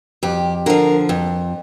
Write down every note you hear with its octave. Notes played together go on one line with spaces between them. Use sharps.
F2 G4
D3 F3 A#4
F2